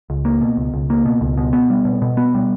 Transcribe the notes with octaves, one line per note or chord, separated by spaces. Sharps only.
C#2
A#3
B2
C#2
C#2
A#3
B2
C#2
B2
B3
G3
B2
B2
B3
G3